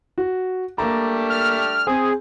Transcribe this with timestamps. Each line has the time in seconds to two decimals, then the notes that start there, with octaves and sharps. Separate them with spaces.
0.18 F#4
0.78 G3 A3 A#3 D4 A#5
1.30 F6
1.87 C4 G#4